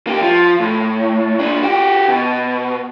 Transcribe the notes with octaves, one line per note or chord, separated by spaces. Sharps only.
A#3 G4
F3
A2
A#2 D4
F#4 G4
B2